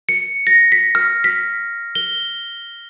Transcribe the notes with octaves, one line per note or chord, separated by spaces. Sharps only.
C#7
A#6
B6
F6
B6
G7